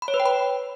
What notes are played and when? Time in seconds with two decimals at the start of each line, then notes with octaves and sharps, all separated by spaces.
0.02 B5
0.08 C#5
0.14 B4
0.20 G5
0.26 B5